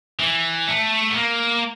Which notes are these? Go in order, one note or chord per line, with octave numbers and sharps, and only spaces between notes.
E3
A3
B3
A#3